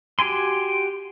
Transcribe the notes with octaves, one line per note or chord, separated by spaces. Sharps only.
F#4 G4 G5 G#5 C6